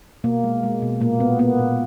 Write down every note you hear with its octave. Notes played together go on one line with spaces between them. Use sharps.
B2 A#3
G#3
G#3
B2
A#2 A#3
A#2 B3
A#3 B3
A#2